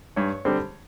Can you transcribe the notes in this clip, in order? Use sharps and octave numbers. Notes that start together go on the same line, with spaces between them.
G2 C#5
D3 G3 C4